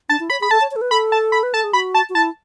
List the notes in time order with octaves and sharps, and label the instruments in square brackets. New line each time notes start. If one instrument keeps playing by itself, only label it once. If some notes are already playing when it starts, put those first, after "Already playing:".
[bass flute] D4 [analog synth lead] A5
[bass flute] E4
[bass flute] C#5 [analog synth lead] B5
[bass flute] G#4 [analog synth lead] B5
[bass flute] A4 [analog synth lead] A5
[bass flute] C#5
C#5
A4
B4
[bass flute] A4 [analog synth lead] B5
[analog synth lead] A5
B5
[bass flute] B4
[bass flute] A4 [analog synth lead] A5
[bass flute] G#4
[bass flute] F#4 [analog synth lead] B5
[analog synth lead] A5
[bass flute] F#4
[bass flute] E4 [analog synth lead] A5